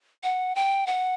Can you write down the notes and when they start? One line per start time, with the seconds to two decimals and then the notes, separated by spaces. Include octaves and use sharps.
0.23 F#5
0.55 G5
0.87 F#5